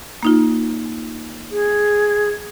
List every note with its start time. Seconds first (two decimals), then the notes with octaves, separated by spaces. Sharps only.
0.23 A#3 D#4 F4
1.51 G#4